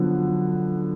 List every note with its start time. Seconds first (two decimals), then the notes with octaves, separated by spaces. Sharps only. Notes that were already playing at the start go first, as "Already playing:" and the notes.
Already playing: D3 F3 F#3 B3